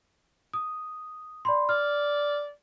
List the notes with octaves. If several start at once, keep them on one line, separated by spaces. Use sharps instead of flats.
D#6
D5 B5 C6
D5 F6